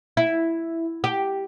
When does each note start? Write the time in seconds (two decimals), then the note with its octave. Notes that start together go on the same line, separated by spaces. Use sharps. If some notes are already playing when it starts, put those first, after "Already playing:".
0.17 E4
1.04 G4